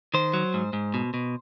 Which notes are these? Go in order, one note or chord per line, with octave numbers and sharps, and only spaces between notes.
D#3 C5
F#3
G#2
G#2
B2
B2